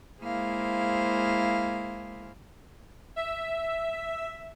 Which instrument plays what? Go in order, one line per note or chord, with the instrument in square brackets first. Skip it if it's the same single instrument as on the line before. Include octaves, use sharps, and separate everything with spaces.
[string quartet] G#3 A#3 E4 G#4 C5 F5
[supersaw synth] E5